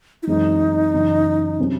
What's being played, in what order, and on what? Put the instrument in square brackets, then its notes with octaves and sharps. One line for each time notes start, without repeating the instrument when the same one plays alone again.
[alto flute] E4
[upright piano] F#2 E3 G#3 C4 [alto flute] D#4
[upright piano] F#2 C#3 E3
C3 F#3 C#4